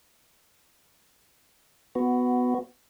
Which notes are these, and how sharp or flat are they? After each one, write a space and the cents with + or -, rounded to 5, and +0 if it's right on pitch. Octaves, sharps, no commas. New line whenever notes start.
B3 +10 F#4 +0